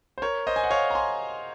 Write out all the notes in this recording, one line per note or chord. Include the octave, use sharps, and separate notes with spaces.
C5
A#4 C#5
C5 D#5
G#5
F#5
C#5 F5
A#5
G#5 C6